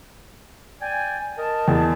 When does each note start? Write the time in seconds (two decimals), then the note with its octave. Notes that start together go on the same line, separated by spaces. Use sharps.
0.81 D5 G5 G#5
1.38 A#4 D#5 A5
1.68 E2